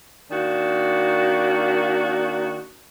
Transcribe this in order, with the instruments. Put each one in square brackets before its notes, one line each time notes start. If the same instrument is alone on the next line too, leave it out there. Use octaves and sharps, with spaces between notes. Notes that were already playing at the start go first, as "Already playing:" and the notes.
[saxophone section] D#3 A#3 D4 F#4